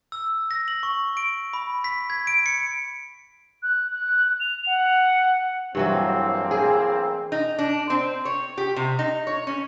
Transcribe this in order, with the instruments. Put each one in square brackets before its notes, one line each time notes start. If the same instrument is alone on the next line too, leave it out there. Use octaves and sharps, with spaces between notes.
[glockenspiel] E6
A#6
F#7
C#6
D7
B5
B6
G#6
D7
C#7
[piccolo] F#6
F#6
F7
F#5
[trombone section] A1 A#3 C4 [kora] G2 E3 F#3
[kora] G#4
[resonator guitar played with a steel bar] D#4
D4
C4
C#5
G4
C3
D#4
C#5
C#4